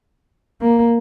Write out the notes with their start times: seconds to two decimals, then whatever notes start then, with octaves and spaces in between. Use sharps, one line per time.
0.61 A#3